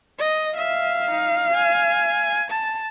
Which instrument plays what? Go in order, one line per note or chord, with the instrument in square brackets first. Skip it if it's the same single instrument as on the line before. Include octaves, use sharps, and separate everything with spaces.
[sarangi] D#5
[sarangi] E5 [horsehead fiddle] F5
[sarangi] D#4
G#5
A5